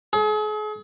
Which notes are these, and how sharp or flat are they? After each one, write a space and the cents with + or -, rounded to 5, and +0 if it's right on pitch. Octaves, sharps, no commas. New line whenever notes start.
G#4 +40